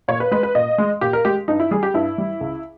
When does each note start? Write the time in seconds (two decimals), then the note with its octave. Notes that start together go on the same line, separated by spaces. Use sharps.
0.08 A#2 C#5
0.20 B4
0.31 G#3 B4
0.43 B4
0.55 A#2 D#5
0.78 G#3
1.01 A#2 G4
1.13 A#4
1.25 G#3 G4
1.48 G2 D#4
1.60 E4
1.71 G3 G#4
1.83 G4
1.94 G2 E4
2.18 G3
2.41 C#2